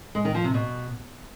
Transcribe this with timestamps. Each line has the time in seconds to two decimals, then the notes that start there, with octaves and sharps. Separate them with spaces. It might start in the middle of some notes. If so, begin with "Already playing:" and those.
0.15 G#3
0.25 D#3
0.34 F3
0.44 C3
0.54 B2